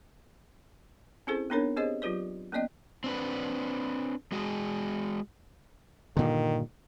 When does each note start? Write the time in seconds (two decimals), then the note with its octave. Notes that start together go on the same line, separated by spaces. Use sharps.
1.27 C4 C#4 E4 G#4 A4 C5
1.50 B3 C4 D4 D#4 A#4 C#5
1.77 C4 G4 G#4 C5 C#5 D#5
2.02 F#3 F4 G4 B4 D5
2.52 A#3 B3 C#4 D5 D#5 G5
3.04 C4 D4 B4
4.32 G#3 F#4 G#4
6.17 G2 A#2 D3 D#3